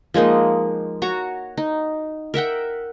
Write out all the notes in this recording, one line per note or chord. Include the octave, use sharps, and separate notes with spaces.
F3 G#3 A#3 D#4
F#4 C#5 A#5
D#4
A#4 E5 F#5 G5